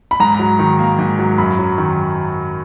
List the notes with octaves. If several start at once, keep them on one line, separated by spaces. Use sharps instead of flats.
B5
G#2 A#5
F#3
D#3
A#3
G#2
F#3
F#2 B5
F#3
D#3